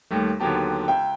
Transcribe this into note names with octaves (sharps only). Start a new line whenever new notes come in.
D#2 G3 A3
D#2 D3 F#3 B3 G4 A5
C#2 E5 G5